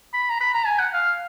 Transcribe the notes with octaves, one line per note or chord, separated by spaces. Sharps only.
B5
A#5
B5
A#5
G#5
F#5
F5